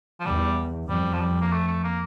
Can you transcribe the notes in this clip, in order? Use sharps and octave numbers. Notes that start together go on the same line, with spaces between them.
F3
E2 G3
F2 G3
F3
G3
A#3
A3
A3
A#3